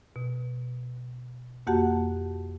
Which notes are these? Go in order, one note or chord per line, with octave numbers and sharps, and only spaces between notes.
B2
F2 A#3 F#4 G4 F#5 A5